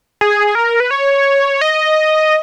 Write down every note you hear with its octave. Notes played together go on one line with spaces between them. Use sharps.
G#4
A#4
B4
C#5
D#5